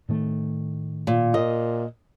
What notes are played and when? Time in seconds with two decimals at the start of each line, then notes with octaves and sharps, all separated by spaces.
0.09 A2 D#3 A3
1.07 A#2
1.34 A#2 D#5